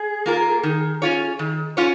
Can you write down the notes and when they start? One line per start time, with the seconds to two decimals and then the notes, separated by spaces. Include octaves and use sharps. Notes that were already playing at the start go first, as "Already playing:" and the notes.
Already playing: G#4
0.26 A#3 F4 A#4
0.63 D#3
1.02 C#4 F4 C#5
1.39 D#3
1.77 C#4 F4 C#5